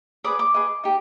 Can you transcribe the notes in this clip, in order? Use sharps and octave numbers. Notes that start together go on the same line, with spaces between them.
G#4 B4 D5 D#6
D6
G#4 B4 D#5
D#4 G4